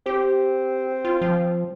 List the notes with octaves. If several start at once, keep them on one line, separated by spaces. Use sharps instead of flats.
C4 G4
F4
F3